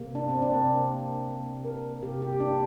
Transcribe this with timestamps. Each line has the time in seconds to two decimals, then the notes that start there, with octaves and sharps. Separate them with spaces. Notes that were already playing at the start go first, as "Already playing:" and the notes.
Already playing: C3 A#3
0.15 D4
0.29 C4
0.42 D4
0.53 C3 A#3
1.28 C3 A#3
1.65 A#4
2.03 C3 A#3 G4
2.22 G4
2.40 D4